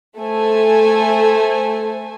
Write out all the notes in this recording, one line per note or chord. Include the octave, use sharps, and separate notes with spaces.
A3 A4 C5 G#5